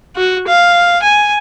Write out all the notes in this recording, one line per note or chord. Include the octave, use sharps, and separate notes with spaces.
F#4
F5
G#5